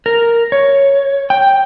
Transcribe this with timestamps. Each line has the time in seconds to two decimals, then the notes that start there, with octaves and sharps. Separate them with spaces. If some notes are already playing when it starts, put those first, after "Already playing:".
0.06 A#4
0.52 C#5
1.30 G5